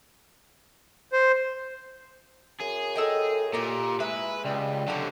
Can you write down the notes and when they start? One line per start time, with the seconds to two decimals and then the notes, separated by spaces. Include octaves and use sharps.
1.13 C5
2.60 F#2 G#4
2.96 A4 D#5 G5
3.53 A#2 G4 A#4
4.00 G#3 E4 B4 E5
4.44 C#2 G3
4.88 D3 F#3 G4 F#5